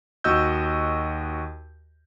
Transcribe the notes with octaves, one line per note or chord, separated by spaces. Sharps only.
D#2 F#4 D#5 E6 G6